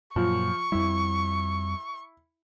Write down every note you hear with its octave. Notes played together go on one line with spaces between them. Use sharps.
F#2 A#2 F3 C#6
F2 G3 E4